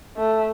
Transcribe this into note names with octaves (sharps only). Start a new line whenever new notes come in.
A3